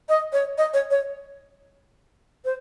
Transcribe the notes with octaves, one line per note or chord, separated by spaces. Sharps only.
D#5
C#5
D#5
C#5
C#5
C5